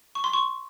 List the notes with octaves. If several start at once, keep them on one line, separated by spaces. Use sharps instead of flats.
C#6
C6
C#6